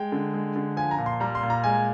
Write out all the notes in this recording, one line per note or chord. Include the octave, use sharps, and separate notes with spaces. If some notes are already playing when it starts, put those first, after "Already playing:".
Already playing: G#3 G5
D3
G#3
D3
F3 G#5
A#5
A#2
C6
G3 A#5
C6
A#2
A#5
G#3 G#5